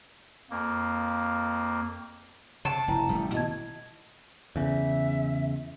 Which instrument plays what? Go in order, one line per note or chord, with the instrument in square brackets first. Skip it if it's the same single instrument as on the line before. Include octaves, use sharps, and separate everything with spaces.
[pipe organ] F2 A#3
[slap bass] C3 [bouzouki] A5
[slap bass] F1 [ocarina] E4 [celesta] G5 A#5
[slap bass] A1 G3 A3
[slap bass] B2 D#3 [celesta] D#5 A5 G#6
[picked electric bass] E2 C#3 [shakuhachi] E5